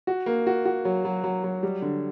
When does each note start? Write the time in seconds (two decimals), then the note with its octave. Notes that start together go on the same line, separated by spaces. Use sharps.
0.07 F#4
0.26 A#3
0.47 F#4
0.65 F#4
0.85 F#3
1.05 F#3
1.24 F#3
1.44 F#3
1.63 G3
1.82 D3